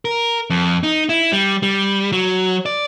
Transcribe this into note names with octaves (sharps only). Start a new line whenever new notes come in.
A#4
F2
D#4
E4
G3
G3
F#3
D5